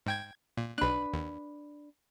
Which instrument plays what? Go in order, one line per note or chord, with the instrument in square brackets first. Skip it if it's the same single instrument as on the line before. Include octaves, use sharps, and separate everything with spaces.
[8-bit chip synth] G#2 G5 G#6
A#2
[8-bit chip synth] B1 F#6 [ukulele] D4 B4
[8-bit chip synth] D#2